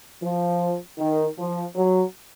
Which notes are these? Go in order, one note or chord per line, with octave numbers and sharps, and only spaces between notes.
F3
D#3
F3
F#3